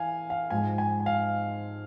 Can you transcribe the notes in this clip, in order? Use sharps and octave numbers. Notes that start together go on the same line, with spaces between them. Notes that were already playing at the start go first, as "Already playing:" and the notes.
Already playing: E3 F5 G#5
F5
G#2 F3 G#3 G#5
G#5
G#5
F5